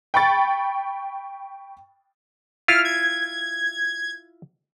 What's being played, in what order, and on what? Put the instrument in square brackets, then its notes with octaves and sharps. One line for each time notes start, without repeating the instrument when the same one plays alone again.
[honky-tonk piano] G5 B5 C#6 A6
[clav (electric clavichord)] E4 F4 [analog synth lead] F6
[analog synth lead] G#6